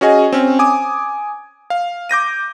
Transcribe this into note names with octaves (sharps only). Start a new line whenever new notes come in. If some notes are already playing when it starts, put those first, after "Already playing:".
C#4 F#4 G#4 D#5 G#5
C4 C#4
G#5 D6 D#6
F5
D6 G6 A#6 D#7